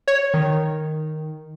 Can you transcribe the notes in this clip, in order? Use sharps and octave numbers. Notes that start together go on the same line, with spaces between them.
C#5
D#3